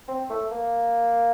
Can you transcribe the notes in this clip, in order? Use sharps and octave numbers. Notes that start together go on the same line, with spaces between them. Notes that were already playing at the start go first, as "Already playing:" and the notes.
C4
A3
A#3